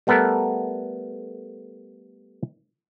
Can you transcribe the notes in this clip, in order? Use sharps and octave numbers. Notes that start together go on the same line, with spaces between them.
G3 A3 B3 A4 A#4